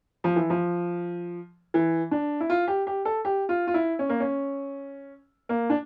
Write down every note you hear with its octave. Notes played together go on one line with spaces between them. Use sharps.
F3
E3
F3
E3
D4
E4
F4
G4
G4
A4
G4
F4
F4
E4
C#4
A#3
C#4
A#3
D4